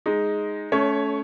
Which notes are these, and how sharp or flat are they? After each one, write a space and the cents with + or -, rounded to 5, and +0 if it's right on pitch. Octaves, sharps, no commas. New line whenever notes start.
G#3 +0 D#4 +0
A3 -20 C#4 +20 C#5 +0